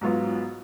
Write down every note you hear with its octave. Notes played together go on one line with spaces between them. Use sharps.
G#2 F#3 B3 F4